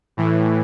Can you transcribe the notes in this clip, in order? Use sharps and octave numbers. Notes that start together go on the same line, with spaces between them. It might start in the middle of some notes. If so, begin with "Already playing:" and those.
A2 E3